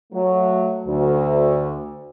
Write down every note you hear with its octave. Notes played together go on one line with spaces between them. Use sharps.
F#3 A3
D2